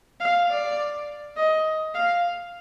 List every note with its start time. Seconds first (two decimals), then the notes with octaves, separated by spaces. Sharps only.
0.20 F5
0.50 D5
1.36 D#5
1.95 F5